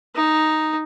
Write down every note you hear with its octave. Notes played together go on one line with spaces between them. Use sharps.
D#4